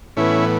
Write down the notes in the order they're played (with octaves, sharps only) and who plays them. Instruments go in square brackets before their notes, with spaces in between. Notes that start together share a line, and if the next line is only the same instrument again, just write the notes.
[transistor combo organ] A2 E3 B3 C#4 E4